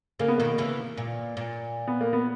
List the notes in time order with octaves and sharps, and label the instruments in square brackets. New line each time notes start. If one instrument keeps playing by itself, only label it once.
[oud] C#3 [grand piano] A#3
[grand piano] B3
[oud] B2 D#3 [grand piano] A#3
[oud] C#3 E3
A#2
A#2
[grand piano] B3
A#3
B3